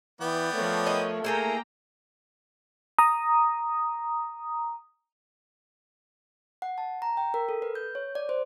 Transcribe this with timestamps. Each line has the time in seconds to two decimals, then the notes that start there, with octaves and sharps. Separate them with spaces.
0.21 E3 B3 D5 G5
0.54 F3 A3 A#4 C#5
0.87 D#5
1.24 A#3 E4 G#4 A4 G5 A#5
2.99 A#5 D#6
6.62 F#5
6.78 A5
7.02 A#5
7.17 G5
7.34 A#4
7.49 A4
7.62 B4
7.75 G6
7.95 C#5
8.15 D5
8.29 C5